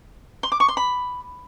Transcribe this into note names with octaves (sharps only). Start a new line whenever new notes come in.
C6
D6
C#6
C6
B5